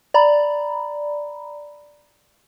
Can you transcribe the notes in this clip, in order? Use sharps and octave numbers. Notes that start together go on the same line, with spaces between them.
D5 A#5 B5